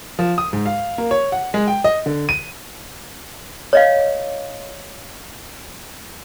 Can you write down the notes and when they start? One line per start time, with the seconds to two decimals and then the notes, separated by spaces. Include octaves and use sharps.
0.19 F3
0.38 D#6
0.53 G#2
0.66 F5
0.98 A#3
1.11 C#5
1.32 F#5
1.54 G#3
1.68 G5
1.84 D#5
2.06 D3
2.29 D#7
3.73 C#5 D#5 F5